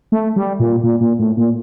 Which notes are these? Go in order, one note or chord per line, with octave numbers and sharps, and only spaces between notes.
A3
G3
A#2
A#2
A#2
A2
A#2